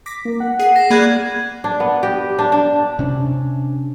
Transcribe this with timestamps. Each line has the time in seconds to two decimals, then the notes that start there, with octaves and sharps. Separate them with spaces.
0.06 D6 A#6 B6
0.25 A#3
0.40 F#5
0.59 G#4 C7
0.76 A#6 C7 E7
0.90 A#3 G#4 D5 B5 F#6 G#6 D#7
1.64 D4
1.80 B3
2.03 G4
2.39 D4
2.52 D4
2.99 C3 C#4 D4